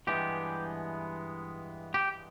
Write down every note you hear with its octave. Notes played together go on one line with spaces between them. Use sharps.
G2 E3 G#3 B3 G4
G4